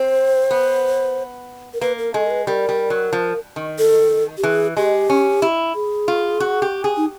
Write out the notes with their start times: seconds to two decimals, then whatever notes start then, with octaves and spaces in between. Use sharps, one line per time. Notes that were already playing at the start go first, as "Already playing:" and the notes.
Already playing: C4 C5
0.51 B3
1.74 A#4
1.81 A#3 B4
1.98 A#4
2.14 G#3 A4
2.26 A#4
2.31 B4
2.47 G3 A#4
2.69 G3
2.90 F#3
3.13 F3
3.56 D#3
3.79 A4
4.38 G4
4.43 E3 G#4
4.77 G#3 G4
5.10 C#4
5.42 E4
5.75 G#4
6.08 F4
6.40 F#4
6.62 G4
6.84 G#4
6.97 D#4